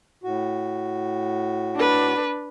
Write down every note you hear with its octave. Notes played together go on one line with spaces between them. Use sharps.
A2 F#4
D4 B4